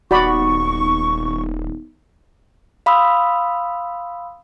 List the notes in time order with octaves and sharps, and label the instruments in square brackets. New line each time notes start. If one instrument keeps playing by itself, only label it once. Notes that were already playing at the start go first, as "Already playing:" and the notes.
[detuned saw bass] D#1 [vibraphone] B3 D#4 [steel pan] F#4 D5 B5 [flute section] C#6
[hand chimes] F5 B5 C6 D#6 E6